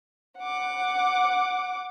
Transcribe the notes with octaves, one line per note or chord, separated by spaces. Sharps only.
F#5 D6